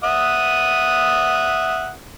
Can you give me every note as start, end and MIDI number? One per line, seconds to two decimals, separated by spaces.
0.04 1.92 76
0.04 1.92 78
0.04 1.92 87